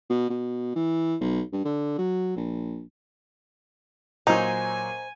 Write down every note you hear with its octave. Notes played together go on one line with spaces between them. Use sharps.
B2
B2
E3
B1
G2
D3
F#3
A#1
A#2 F#3 D#4 C5 G#5